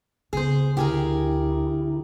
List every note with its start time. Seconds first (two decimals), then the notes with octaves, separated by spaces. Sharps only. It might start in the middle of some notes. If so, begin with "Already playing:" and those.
0.33 C#3 B3 G#4 C5
0.77 D2 D3 E4 G4 G#4 A#4